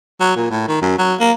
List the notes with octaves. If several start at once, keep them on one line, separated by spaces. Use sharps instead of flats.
F#3
A#2
A2
D#3
F#2
F#3
A#3